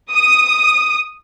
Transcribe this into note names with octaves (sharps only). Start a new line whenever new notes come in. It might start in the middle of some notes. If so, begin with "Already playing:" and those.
D#6